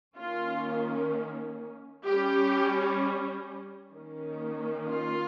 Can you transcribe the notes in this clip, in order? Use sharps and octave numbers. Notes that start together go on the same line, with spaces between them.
D#3 A#3 C#4 F4
G3 C#4 G4
D#3 A#3 C#4
F4